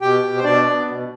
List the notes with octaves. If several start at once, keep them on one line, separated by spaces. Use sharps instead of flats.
B2 G4 G5
B2
C5
B2 D4 D5
B3
B2